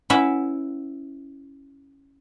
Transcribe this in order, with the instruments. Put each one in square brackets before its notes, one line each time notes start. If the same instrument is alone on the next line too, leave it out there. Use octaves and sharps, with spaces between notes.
[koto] C#4 E4 B4 E5 F#5